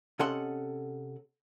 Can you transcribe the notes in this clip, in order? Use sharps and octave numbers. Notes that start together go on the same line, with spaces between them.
C3 C#4 A4 D#5 F#5 C6